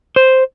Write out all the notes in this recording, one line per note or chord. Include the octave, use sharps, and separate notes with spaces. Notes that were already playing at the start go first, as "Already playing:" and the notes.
C5